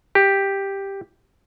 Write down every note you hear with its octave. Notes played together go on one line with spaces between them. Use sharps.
G4